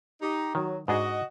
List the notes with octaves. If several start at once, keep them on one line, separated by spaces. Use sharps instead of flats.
D#4 G4
D#3 F#3
G#2 D4 F#4 G#4 D#5